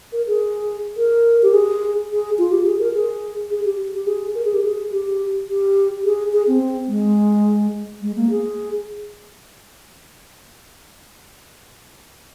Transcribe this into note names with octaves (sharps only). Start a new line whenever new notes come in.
A#4
G#4
A#4
G4
G#4
G#4
F4
G4
G#4
A#4
G#4
G#4
G4
G4
G#4
A#4
G#4
G4
G#4
G4
G4
G#4
G#4
C4
G#3
G#3
A#3
G#4